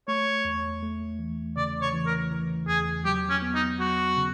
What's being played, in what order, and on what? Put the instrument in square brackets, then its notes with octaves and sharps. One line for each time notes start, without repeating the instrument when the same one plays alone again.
[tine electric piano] A3 [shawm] C#5
[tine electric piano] E2
A3
E3
[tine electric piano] C#3 [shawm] D5
[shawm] C#5
[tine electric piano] E3
[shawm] A#4
[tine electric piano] E3
[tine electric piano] E2 [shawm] G#4
[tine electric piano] F#3 [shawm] G4
[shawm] C#4
[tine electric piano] B3
[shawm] D#4
[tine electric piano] F#3 [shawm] F#4
[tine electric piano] C#3